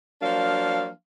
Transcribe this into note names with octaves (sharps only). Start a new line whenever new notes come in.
F3 F#3 A#3 D4 F5